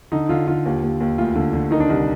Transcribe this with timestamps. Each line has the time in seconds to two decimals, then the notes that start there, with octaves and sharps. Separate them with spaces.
0.12 D3 D#4
0.29 D3 F4
0.48 D3 F4
0.65 D#2
0.83 D#2
1.00 D#2
1.18 D2 F4
1.36 D3
1.53 D3
1.71 D#3 D#4
1.80 D4
1.89 C2 D#4